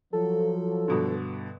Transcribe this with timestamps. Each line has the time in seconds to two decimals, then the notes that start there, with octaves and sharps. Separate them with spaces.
0.13 F3 F#3 A4
0.88 G2 B2 D3